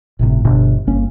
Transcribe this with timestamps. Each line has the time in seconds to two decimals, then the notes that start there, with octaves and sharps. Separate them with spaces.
0.19 G1 A2 C3
0.45 G1 B2 D3
0.87 G1 A#3 C#4